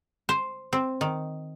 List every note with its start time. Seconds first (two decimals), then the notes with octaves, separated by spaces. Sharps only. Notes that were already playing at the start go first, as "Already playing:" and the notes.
0.29 C5
0.73 C4
1.01 D#3